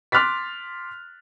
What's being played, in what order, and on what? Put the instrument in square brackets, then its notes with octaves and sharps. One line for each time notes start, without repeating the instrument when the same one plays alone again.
[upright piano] C6 D6 F6 F#6 A6 B6